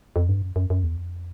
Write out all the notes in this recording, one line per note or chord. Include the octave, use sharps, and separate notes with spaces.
F2
G2
F#2
F#2
F#2
E2
F2